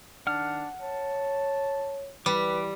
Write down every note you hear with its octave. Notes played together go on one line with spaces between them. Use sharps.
D#3 D4 F#5 F6
C#5 A5
E3 G3 B4 D6